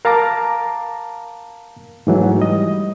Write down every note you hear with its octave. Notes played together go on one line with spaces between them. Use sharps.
A#4 F5 A5 A#5 D6
G#2 E3 F#3 A3
G3 D#5